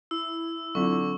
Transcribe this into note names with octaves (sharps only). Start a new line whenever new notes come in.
E4 E6
D3 F#3 C4 F4 C#6